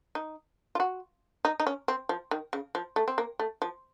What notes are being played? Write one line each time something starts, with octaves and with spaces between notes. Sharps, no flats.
D#4
F4
F#4
D#4
D#4
C#4
C4
F3
D#3
C#3
F3
A3
C4
A#3
A3
F3